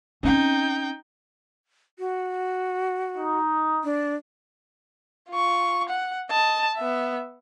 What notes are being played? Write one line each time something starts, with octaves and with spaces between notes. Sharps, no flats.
C4 C#4 D#4 G5
F#4
D#4
D4
F4 C#6
F#5
D#5 A5
B3 E5